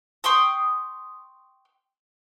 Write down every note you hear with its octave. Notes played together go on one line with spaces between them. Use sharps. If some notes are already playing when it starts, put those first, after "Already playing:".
G5 C6 C#6 D#6